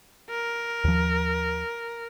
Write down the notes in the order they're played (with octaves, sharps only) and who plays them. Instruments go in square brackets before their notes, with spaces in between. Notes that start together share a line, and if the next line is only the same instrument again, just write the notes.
[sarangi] A#4
[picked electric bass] D#2 F3